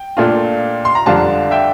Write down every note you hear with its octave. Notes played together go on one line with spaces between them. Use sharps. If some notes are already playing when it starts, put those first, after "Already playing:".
Already playing: G5
A#2 A3 D4 F4
C6
A#5
F2 D3 G3 D4 F4 F5 A5
E5 G5